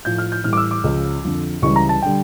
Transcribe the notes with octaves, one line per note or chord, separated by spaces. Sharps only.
A2 F3 G6
F6
G6
A2 E3 G3 F6
D6
E6
D6
C#2 C#3 F3
F2 D3 F3
C#2 C#3 E3 G3 C#6
A#5
A5
D3 G3 G5